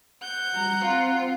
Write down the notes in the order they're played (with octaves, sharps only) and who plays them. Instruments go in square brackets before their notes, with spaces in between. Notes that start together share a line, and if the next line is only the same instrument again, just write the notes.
[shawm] F#5 [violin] G6
[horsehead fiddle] G3 A#5
[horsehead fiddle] C4 [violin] F4